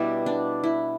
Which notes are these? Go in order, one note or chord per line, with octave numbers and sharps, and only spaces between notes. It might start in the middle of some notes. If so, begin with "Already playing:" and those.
Already playing: B2 G3 D4 E4 G4 B4
D4
E4